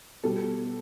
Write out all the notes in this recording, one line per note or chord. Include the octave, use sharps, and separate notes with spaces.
B2 G3 A4